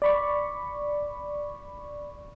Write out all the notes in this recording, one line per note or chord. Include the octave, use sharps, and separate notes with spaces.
D5 B5 C#6